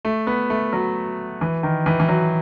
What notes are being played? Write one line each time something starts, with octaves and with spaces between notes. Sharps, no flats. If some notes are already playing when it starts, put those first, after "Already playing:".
A3
B3
A3
F#3
E3
D#3
E3
E3
F#3